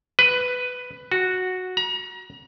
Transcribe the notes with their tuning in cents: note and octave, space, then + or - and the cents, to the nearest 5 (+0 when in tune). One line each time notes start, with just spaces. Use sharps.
B4 +10
F#4 -5
A#5 +35